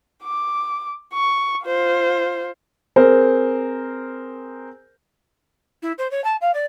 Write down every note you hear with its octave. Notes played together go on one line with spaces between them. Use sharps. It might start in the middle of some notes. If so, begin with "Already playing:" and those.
D6
C#6
F4 C5
C4 G#4 A#4 C5
E4
C5
C#5
A5
F5
D5